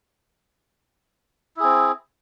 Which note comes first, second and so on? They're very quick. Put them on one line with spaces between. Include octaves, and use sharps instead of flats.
E4 G#4 C4